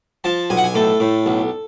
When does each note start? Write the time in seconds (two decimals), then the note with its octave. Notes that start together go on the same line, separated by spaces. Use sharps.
0.24 F3 A5
0.50 B1 G#5
0.57 F#5
0.64 G#5
0.75 A2 A4
1.00 A2
1.26 B1